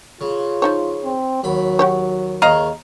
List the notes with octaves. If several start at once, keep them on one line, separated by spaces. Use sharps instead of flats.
C#3 F4
F3 D#4 C#5
C4
D#2 F#3 B5
F#4 G4 C#5
D#2 C#3 D#5 F5 A#5